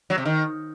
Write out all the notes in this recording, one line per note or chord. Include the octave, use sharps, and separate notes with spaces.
F#3
C3
D#3